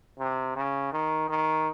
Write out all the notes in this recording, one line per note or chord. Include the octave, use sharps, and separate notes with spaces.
C3
C#3
D#3
D#3